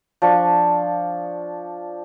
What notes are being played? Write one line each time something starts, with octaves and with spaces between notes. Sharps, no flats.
F3 D4 C#6